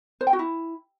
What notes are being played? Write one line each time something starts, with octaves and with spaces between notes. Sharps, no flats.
C5
G5
F#4
E4